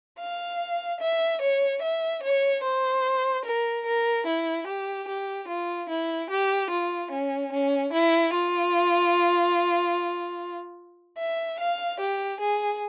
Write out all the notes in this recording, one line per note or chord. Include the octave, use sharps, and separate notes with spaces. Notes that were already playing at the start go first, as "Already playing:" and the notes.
F5
E5
C#5
E5
C#5
C5
A#4
A#4
E4
G4
G4
F4
E4
G4
F4
C#4
C#4
E4
F4
E5
F5
G4
G#4